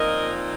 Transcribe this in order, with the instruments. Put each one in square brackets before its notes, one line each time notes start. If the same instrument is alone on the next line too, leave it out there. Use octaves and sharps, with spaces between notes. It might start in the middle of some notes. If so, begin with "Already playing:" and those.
Already playing: [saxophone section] A#2 F3 C4 D#4 A#4 D#5